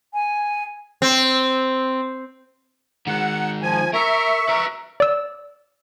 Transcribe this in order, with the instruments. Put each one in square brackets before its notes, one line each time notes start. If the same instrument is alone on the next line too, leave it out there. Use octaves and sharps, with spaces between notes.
[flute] G#5
[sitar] C4
[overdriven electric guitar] D#3 G#3 [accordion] F#5
[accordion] F3 G#5
[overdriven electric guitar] A#4 [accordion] E5 C#6
[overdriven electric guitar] B4 A#5
[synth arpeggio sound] D5 E6